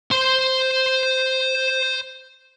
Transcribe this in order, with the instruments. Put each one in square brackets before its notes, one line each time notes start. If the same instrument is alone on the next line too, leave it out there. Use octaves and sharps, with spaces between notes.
[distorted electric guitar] C5 C6